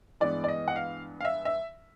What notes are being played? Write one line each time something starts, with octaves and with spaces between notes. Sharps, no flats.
G2 E3 G#3 B3 D5
D5
D#5
F#5
F5
F5
E5
E5